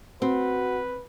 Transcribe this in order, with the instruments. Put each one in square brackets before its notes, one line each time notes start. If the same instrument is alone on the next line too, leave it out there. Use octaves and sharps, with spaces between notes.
[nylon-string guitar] C4 [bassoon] F#4 [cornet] B4